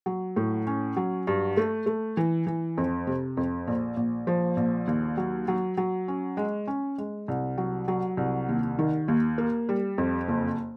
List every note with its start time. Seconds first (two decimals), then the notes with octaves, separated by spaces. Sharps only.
0.06 F#3
0.36 A2
0.67 C#4
0.97 F#3
1.27 G2
1.57 A3
1.86 A3
2.17 E3
2.47 E3
2.78 F2
3.07 C3
3.37 F2
3.67 A#1
3.97 A#1
4.27 F3
4.57 A#1
4.87 D#2
5.17 F#3
5.48 F#3
5.77 F#3
6.08 C#4
6.37 G#3
6.67 C#4
6.98 G#3
7.28 C2
7.58 F#3
7.88 F#3
8.17 C2
8.49 D#2
8.79 D#3
9.08 D#2
9.38 A#3
9.69 G3
9.98 F2
10.28 F#1